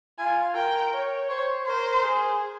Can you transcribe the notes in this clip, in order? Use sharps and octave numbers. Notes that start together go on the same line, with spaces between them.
F4 G#5
A#4 G5
C#5
C5 C#5
A#4 C5
G#4